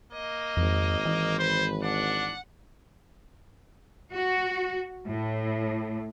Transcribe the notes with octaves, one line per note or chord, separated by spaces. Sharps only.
A#3 D#5
G#1 F2
E3
B4 C5
D4 F#5
F#4
A2